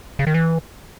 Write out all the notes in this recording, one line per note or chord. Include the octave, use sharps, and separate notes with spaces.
C#3
D#3
E3